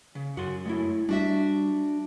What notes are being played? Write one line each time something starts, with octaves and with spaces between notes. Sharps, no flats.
C#3
F#2 F#4 C6
G#3 A3 E4
G3 D4 F#4 E5